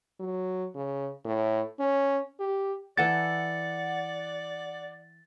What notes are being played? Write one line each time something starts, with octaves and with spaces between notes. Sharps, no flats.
F#3
C#3
A2
C#4
G4
E3 A4 D5 F#5 D6 A6 C#7